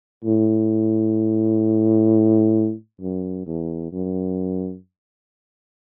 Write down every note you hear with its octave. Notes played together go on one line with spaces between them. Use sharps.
A2
F#2
E2
F#2